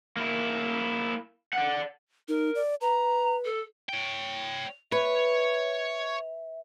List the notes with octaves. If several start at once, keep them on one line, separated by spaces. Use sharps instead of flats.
A#3 E4
D5 F#5
D#4 A#4
D5
B4 A#5
A4
C#5 G5
B4 C#5 E5